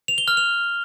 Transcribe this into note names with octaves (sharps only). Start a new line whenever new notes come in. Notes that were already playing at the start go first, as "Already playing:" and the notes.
F7
G7
F6
F7